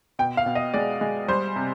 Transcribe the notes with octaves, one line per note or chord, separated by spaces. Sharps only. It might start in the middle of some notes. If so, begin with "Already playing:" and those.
B2 G5
F5
B2
D#5
G#3 D5
G#3
G3 C5
C3